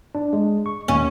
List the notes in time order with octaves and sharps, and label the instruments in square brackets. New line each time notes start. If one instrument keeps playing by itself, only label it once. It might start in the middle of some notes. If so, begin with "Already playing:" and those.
[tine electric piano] D4
G#3
C#6
[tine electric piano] D#2 [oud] C#4